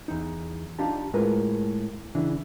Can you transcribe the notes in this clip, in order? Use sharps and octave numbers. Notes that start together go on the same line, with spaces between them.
E2 D#4
D4 D#4 F4 G4 A5
A2 G#3 F4 A#4 B4
C#3 E3 D4